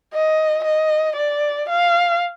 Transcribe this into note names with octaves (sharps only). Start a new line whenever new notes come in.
D#5
D#5
D5
F5